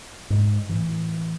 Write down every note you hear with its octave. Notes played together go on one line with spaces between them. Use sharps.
G#2
A2 E3